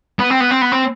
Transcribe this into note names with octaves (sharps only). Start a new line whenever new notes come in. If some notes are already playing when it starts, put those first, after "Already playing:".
B3
C4
B3
C4
B3
C4